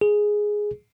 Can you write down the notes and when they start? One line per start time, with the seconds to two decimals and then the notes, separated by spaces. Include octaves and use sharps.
0.01 G#4